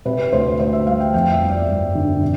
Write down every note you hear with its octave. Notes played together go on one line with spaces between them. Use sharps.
C3 B4
D2 C5
D2 C5
E5
G3 F5
G5
F2 G5
E5
G1
D5
G1
D3
C3